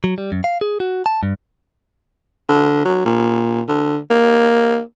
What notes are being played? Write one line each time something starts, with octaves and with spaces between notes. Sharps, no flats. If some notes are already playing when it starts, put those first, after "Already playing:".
F#3
G3
F#2
F5
G#4
F#4
A5
G2
D3
F#3
A#2
D3
A#3